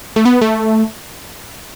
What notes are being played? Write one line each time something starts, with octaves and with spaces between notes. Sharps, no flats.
A3
B3
A3